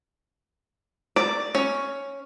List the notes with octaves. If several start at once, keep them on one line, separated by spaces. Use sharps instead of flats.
D5
C#4